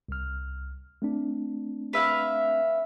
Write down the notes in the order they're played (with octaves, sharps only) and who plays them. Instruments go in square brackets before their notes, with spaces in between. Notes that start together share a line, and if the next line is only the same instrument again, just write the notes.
[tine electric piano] C2 F6
A3 C4 D4
[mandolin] B4 E5 F5